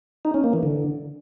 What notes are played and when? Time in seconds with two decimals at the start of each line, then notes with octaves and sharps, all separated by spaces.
0.25 D#4
0.34 C#4
0.44 A#3
0.53 E3
0.63 D3